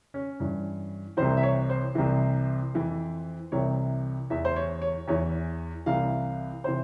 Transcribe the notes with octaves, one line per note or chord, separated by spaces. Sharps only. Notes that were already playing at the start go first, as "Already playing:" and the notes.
C#4
G2 E3 C#4
C2 C3 E3 C5
E5
C#5
C5
C2 C3 E3
F2 E3
C2 C3 E3 C#5
E2 E3 E5
C5
C#5
C#5
E2 E3 C#5
C2 C3 E3 F5
C3 E3 C5